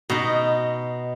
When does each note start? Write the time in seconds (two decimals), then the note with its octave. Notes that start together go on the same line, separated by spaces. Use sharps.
0.10 B2 D#4